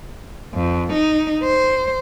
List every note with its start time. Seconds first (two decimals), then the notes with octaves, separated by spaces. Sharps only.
0.54 F2
0.92 D#4
1.43 C5